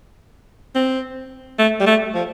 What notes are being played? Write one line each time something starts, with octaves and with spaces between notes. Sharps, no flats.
C4
A3
G3
A3
F3